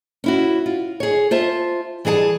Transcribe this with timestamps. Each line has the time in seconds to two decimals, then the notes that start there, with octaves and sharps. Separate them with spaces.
0.24 C#4 E4 F#4
0.66 F4
1.00 G#4 C#5
1.31 F4 C5 E5 A5
2.05 E3 G3 G#4 F#5 A5